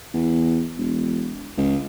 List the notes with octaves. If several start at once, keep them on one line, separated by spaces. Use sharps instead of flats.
E2
E1
C#2